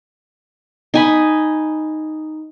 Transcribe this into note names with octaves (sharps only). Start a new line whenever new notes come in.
D#4 G#5 B5